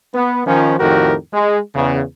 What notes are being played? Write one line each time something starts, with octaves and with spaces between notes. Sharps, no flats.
B3
D#3 F3 C#4
F2 A2 D#3 F#4 G4 A#4
G#3
E2 C#3